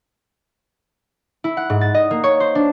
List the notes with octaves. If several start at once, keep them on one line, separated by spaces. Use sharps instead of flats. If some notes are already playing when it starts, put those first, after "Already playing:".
E4
F#5
G#2
A6
D#5
A#3
C#5
C5
D4